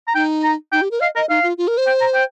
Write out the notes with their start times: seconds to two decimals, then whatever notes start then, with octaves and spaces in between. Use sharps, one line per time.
0.08 A#5
0.15 D#4 G5
0.43 A#5
0.72 D#4 G5
0.82 G4
0.91 A#4
1.00 D#5 F5
1.16 A#4 D#5
1.29 D#4 F5
1.43 F4
1.58 F4
1.68 A#4
1.78 C5
1.87 G5
2.01 A#5
2.14 G5